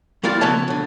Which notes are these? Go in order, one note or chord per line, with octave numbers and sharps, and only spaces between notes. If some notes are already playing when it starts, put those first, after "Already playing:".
F#3 G3 E4 F4 D5
C#3 F3 B3 C#5 E5 A5
D2 D3